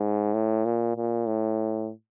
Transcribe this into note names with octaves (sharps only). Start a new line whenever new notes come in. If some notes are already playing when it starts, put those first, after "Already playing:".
Already playing: G#2
A2
A#2
A#2
A2